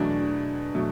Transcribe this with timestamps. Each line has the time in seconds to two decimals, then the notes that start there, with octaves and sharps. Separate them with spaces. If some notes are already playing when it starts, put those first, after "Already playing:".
Already playing: E2 B2 F#3 A3 D4
0.75 B2 F#3 A3